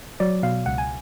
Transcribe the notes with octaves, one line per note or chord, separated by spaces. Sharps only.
F#3 D5
B2 F5
C#2 F#5
G#5